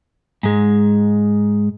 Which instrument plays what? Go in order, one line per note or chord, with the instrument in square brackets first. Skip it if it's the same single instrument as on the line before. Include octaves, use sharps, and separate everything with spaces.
[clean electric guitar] G#2 G#3